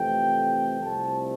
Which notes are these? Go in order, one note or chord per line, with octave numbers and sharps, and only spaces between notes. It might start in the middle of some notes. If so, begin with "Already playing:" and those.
Already playing: F2 C3 E3 A3 G5
C2 C3 F3 A3 A5